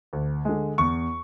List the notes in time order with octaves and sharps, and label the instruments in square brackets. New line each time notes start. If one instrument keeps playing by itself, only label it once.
[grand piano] D2
D3 G#3
E2 C#6